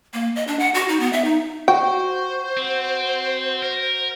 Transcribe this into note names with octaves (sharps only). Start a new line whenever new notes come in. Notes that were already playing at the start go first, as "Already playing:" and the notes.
A#3
D#5
D4
F#5
F#4
D#4
B3
E5
D#4
F#4 C5 G5 C#6
C4
A#4